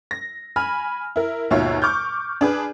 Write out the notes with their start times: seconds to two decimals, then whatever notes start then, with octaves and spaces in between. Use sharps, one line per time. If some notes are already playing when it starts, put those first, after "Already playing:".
0.11 A#6
0.56 G#5 B5 F6
1.16 E4 A#4
1.51 D#2 G#2 B2 F4 C#5 E5
1.82 C#6 D6 F6 G6
2.41 D4 G#4 B4